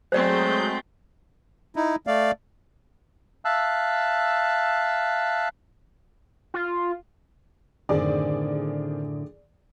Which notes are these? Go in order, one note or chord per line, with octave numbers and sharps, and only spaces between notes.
F#3 G#3 A3 C4 C5 D5 G6
D#4 E4
A3 D5 F5
E5 F5 A5 E6 F#6
F4
F#2 A2 D3 D#3 C4 G#4 D5